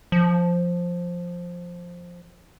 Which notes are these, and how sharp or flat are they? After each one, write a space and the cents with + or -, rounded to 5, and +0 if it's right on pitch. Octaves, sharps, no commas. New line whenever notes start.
F3 +5